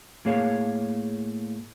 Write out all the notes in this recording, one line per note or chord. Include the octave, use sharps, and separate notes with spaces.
A2 A#3 G#4 C#5 F5